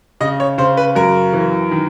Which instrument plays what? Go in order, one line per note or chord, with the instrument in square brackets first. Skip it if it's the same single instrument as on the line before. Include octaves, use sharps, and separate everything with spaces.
[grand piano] C#3 D#5
C#5
C#3 C5
B4
F#2 A#4
E3
D#3